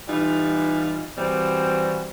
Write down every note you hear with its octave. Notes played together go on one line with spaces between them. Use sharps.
E3 G3 D#4 F4
E3 G3 C4 F#4